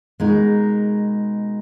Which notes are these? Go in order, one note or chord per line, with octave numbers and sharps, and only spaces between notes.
B2 G#3 D#4 A#4